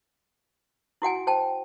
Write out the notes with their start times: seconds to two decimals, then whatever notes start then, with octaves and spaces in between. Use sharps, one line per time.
1.02 E4 F#4 F#5 G#5
1.27 C5 G5 A5